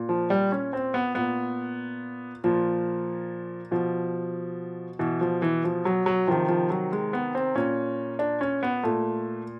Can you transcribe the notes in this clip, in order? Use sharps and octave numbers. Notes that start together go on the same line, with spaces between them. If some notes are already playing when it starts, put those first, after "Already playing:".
Already playing: A#2
F3
G3
C#4
C4
B3
A#2 B3
A#2 F3
B2 F3
B2 E3
F3
E3
F3
F#3
F#3
C3 D#3 F3
F3
F#3
G#3
B3
C4
A#2 C#4
D4
C#4
B3
A#2 A3